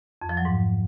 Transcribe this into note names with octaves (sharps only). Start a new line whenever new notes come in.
F2
F3
F#3
G#2